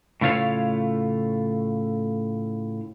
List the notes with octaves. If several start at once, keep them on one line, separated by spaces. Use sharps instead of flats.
A2 C#3 A3 F4 C#5 F5